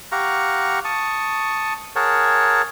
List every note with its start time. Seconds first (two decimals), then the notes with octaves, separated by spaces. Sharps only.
0.12 G4 F5 F#5 A#5 C#6
0.84 A5 C#6 D#6
1.96 G#4 A#4 C#5 F#5 A5